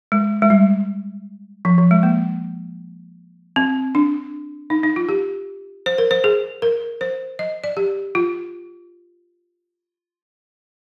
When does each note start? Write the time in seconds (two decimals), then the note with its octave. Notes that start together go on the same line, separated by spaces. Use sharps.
0.12 G#3
0.42 G#3
0.50 G3
1.65 F3
1.78 F3
1.91 G#3
2.03 A#3
3.56 C4
3.95 D4
4.70 D#4
4.83 D#4
4.96 F4
5.09 G4
5.86 C5
5.98 A#4
6.11 C5
6.24 G#4
6.62 A#4
7.01 C5
7.39 D#5
7.64 D5
7.77 G4
8.15 F4